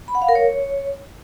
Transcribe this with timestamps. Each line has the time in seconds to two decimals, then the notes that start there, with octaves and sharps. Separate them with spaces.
0.08 B5
0.15 F#5
0.22 F5
0.29 A#4
0.35 C#5